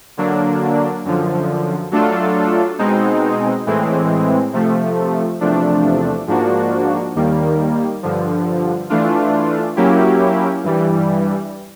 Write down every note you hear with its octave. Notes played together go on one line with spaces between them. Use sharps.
D3 F#3 A#3 D4
F#2 D3 F3
F#3 A3 D4 F4 A4
B2 G#3 C4 D#4
A2 E3 G#3 C4
C3 F3 A3
E2 C3 F3 A3 D4
G#2 F3 A#3 D4 F#4
D#2 D#3 G3 A#3
G2 D3 F3
E3 A3 D4 F4
F#3 A#3 C#4 E4 G4
G2 E3 G3